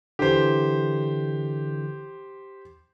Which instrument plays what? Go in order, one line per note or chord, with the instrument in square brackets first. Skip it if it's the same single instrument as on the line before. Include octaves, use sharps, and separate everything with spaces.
[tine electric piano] D3 E3 [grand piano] G4 C5